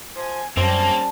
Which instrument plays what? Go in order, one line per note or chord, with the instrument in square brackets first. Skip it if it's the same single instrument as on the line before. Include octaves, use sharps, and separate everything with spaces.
[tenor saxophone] F3 [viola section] G#5
[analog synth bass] F#2 [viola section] G3 C#4 A5 [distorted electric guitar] A#3 [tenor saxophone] C4